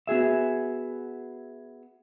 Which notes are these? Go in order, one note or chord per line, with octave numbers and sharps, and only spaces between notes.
B3 F#4 G#4 E5